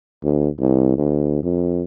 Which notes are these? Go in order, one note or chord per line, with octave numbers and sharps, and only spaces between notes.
D2
C2
D2
F2